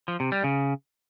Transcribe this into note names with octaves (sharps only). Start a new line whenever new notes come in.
F3
C3
G3
C#3